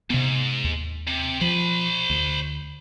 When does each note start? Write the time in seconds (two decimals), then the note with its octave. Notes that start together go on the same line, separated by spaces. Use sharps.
0.10 G#2 C3 B3
0.64 D#2
1.07 C3
1.41 F3 C5 B5
2.10 D2